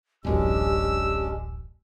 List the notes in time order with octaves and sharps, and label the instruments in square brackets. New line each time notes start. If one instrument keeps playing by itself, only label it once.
[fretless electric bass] D1 A1 F#2 [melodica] G#3 C#4 D4 [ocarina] G4 [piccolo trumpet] E6